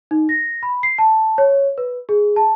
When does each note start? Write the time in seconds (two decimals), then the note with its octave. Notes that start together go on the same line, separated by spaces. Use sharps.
0.11 D#4
0.29 A#6
0.63 B5
0.83 C7
0.98 A5
1.38 C#5
1.78 B4
2.09 G#4
2.36 A5